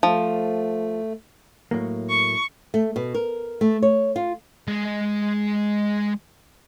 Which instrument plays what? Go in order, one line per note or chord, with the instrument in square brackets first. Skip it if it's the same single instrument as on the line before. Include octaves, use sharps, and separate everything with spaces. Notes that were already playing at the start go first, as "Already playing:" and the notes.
[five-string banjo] F3 [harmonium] A3
[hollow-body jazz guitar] A2 F#3 A#3
[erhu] C#6
[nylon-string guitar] A3
B2
A#4
A3
C#5
F4
[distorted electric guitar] G#3 G#5